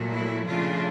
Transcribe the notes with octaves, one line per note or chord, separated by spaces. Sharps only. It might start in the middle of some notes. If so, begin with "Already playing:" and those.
Already playing: A#2 F#3 A3
E4
C#3 F3 A3 D4 F4